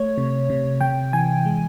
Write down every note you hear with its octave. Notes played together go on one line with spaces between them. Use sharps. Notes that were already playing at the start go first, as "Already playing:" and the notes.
Already playing: A3 C#5
C3
C3
C3 G5
E3 G#5
G#3